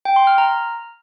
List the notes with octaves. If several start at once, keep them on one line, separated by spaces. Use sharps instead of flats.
G5
C6
F6
A#5